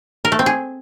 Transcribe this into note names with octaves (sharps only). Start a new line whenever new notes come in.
A#4
A3
C4
G#4